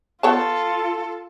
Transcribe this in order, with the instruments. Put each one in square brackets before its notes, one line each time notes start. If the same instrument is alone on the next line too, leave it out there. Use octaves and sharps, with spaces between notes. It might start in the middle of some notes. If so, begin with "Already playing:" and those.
[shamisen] B3 C#5 A5 [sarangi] F4 [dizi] A4